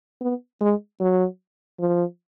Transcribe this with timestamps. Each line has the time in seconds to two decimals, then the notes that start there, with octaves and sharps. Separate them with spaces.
0.21 B3
0.61 G#3
1.00 F#3
1.79 F3